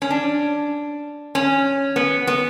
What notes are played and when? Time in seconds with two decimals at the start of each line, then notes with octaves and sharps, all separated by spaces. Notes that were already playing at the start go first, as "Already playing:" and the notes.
0.02 C#4
0.10 D4
1.35 C#4
1.96 B3
2.27 B3